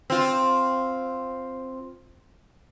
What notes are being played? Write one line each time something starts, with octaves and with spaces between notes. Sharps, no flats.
C4 F4